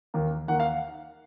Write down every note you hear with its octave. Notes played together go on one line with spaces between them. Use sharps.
D#2 D#3 A#3
D#2 D#3 A#3 F#5
F5